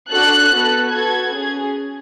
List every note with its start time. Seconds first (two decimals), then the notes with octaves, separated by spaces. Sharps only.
0.10 D4 F#4 A4 F#6
0.51 B3 F#4 A4
0.91 B3 F#4 A4 G#6
1.31 C#4 G#4